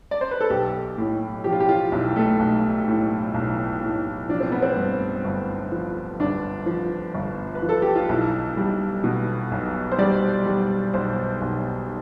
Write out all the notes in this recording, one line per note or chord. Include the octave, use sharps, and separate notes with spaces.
D5
C5
B4
A4
B1 G4
A2
F3 G4
F4
G4
F4
B1 E4
A3
B1
A2
B1
A2
F3 D4
C4
B3
C4
G2
G1
F3
G1 D4
F3
G1
B4
F3
A4
G4
F4
B1 E4
G3
B2
B1
C5
G3 D5
G3
B1 C5
B1